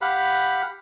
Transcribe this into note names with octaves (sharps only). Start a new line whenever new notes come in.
G4 F5 F#5 B5